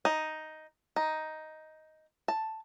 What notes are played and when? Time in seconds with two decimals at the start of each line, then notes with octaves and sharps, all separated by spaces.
0.05 D#4
0.96 D#4
2.28 A5